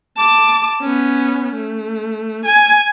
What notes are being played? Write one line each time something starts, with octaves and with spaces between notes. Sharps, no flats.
A5 D6
B3 C#4
A3
G#5